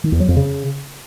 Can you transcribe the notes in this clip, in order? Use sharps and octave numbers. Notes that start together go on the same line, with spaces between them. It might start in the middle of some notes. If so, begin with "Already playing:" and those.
D#3
E2
F#3
F2
C#3